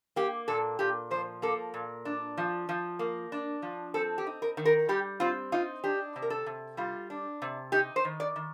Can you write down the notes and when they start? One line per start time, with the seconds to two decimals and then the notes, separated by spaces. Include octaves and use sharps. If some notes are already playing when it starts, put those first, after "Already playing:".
0.16 A#3 G4
0.48 A#2 A4
0.79 A#2 G4
1.11 F3 C5
1.42 A#3 A4
1.74 A#2
2.05 D4
2.38 F3
2.69 F3
2.99 A#3
3.32 D4
3.62 F3
3.94 C4 A4
4.18 G4
4.27 D#4
4.42 A#4
4.57 D#3
4.65 A#4
4.89 G3 G4
5.20 C4 F4
5.52 D#4 F4
5.84 D4 G4
6.16 C3
6.22 A#4
6.30 A4
6.46 C3
6.77 G3 F4
7.10 D4
7.42 C3
7.72 D#4 G4
7.96 C5
8.05 D#3
8.20 D5
8.36 D#3